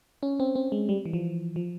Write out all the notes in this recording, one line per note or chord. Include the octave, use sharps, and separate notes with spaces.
C#4
C4
C4
G#3
G3
E3
F3
F3